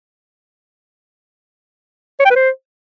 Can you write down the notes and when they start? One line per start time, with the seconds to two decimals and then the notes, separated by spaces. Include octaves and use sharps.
2.20 C#5
2.25 G5
2.30 B4
2.36 C5